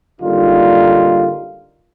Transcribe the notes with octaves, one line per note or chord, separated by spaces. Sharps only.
G#1 D3 G3 A#3 D#4 F4